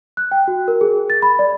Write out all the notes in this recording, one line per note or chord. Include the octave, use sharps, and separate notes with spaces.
F#6
G5
F#4
A#4
G#4
A6
B5
D5